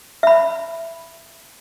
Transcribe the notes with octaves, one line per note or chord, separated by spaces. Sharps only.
E5 B5